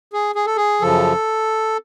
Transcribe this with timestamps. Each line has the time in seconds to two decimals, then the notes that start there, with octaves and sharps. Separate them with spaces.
0.13 G#4
0.35 G#4
0.47 A4
0.57 G#4
0.81 F#2 C#3 F3 A4